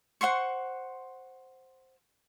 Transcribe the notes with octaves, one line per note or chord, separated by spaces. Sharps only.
C5 F#5 C6 C#6